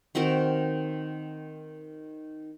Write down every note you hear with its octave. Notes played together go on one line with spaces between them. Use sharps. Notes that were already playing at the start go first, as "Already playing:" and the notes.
D#3 C4 F#4 A#4